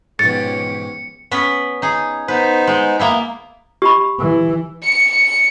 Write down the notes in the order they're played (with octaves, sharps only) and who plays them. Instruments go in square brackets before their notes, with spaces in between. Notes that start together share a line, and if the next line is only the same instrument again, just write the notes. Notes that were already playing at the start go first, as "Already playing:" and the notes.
[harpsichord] G#2 B2 [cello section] F3 C#4 G4 [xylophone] A6 [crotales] C#7
[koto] B3 C#4 B4
D#4 G#4
[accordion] B3 D#4 C5 [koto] B4
[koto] G#3
A#3 B3 E4
[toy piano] G4 B5
[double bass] E3
[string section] C#7